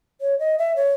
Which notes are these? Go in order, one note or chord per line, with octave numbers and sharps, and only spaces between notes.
C#5
D#5
E5
C#5